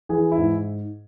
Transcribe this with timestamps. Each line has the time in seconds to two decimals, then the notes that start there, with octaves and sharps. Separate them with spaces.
0.09 E3 G#4
0.31 E4
0.37 G#2